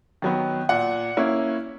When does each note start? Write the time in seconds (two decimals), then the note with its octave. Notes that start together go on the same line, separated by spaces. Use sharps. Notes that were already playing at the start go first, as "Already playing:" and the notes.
0.22 D#3 F#3 B3
0.69 A#2 F#5
1.17 A#3 C#4 E4